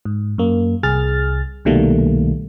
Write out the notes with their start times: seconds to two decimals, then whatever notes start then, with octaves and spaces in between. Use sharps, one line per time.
0.05 G#2
0.38 F#2 A#3
0.83 C2 G#4 F6 A6
1.65 C2 B2 D#3 G3 A3 A#3